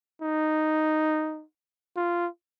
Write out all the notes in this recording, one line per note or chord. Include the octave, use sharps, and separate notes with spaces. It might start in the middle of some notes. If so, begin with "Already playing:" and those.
D#4
F4